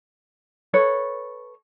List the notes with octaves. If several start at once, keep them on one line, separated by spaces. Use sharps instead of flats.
A4 B4 C#5